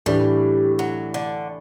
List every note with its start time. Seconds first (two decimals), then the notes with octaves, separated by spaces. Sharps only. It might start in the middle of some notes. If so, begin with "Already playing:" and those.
0.06 A2 E3 G3 A3 D4
0.79 F#3
1.14 D3